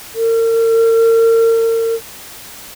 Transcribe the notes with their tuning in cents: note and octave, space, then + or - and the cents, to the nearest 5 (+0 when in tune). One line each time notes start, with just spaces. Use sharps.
A#4 -40